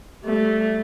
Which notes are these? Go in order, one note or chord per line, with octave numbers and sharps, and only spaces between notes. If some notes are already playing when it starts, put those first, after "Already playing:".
G3 A3